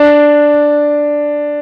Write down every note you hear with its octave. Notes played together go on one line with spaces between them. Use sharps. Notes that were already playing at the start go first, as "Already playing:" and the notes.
Already playing: D4